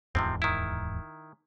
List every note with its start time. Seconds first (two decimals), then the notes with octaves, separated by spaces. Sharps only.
0.15 D1 E2 G#2 C3 F3 C4
0.42 D#3 E4